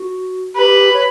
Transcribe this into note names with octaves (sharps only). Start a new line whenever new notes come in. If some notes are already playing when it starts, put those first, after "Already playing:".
Already playing: F#4
G4 B4
C#5